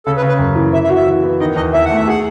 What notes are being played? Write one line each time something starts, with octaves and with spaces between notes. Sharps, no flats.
C#3 A4
B4
C#3
B4
F#2
E3
E3 E5
E5
F#4
E5
E3
B3
D#3 D#5
E2 D#5
E2 E5
F#5
A3
E5
G#4 F#5